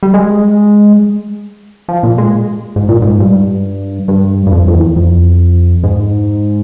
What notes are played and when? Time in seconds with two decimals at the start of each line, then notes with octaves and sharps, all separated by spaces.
0.03 G3
0.14 G#3
1.89 F3
2.03 A#2
2.18 G#3
2.76 G#2
2.89 A#2
3.02 G#2
3.20 G2
4.08 G2
4.47 G2
4.52 F2
4.68 F2
4.74 E2
4.96 F2
5.84 G#2